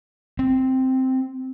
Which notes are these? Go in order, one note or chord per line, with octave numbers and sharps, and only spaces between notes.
C4